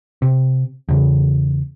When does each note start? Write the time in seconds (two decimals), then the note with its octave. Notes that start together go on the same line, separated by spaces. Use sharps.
0.22 C3
0.89 E2 C#3